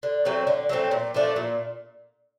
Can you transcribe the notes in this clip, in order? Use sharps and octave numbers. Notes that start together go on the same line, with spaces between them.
D3
F#3 A3 C4
D3
F#3 A3 C4
A#2
F3 A3 D4
A#2